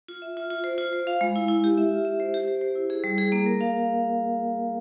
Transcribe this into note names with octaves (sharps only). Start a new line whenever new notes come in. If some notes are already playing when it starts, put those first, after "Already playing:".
F4
E5
F4
F4
C5
F4
C5
F5
G#3
E4
E4
G4
E5
F4
E5
C5
G4
C5
C5
E4
G#4
G3
G#4
A#3
A#4
F5